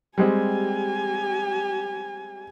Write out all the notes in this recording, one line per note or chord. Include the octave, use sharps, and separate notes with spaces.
G3 G#3 C4 G4 G#5